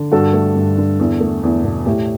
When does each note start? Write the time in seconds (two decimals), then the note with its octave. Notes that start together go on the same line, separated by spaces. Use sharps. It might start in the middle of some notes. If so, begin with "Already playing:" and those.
Already playing: D3
0.12 G2 F#4 A4
0.33 A3
0.55 G2
0.78 D3
1.00 E2
1.20 A3
1.43 E2
1.64 B2
1.86 A2 G4